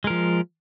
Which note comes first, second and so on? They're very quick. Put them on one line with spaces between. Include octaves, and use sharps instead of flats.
G#3 A#4 F3